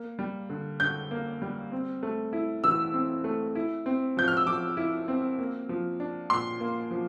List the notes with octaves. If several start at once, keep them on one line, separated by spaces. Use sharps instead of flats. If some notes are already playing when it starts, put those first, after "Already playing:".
Already playing: A#3
G3
D3
D3 G6
A#3
G3
C4
A3
E4
E3 E6
C4
A3
E4
C4
F3 G6
F6
E6
F3 D6
E4
C4
A#3
F3
D4
A#2 C6
A#3
F3